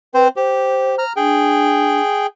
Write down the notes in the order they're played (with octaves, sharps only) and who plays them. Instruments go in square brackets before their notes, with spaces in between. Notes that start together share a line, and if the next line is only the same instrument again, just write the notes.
[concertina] C4 C5 [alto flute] B4
[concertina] G4 [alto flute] C5
[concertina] A#5 F6
[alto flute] D4 [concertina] G#4 G5